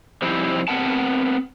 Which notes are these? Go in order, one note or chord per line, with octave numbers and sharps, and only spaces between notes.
F3 G3 C4 D#4 E4
B3 C4 A#4 B4 F#5 A5